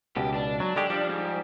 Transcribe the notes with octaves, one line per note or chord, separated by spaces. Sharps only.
C#2 B2 G4
D4
F#3 D4
D3 G#3 G4
F3 G3 G4
G#2